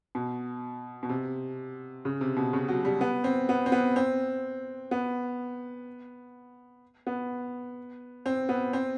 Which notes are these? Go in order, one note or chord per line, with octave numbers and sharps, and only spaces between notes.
B2
B2
C3
C#3
C3
B2
C#3
F#3
G3
B3
C4
B3
C4
B3
C4
B3
B3
C4
B3
C4